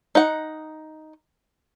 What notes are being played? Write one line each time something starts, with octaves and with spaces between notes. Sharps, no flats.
D#4 F#5